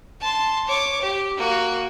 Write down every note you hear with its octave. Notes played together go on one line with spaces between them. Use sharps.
A5 C6
C#5 D6
G4
A#3 F#4